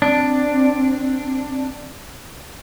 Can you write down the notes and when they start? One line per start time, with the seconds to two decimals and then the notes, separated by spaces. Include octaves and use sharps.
0.02 C4 D4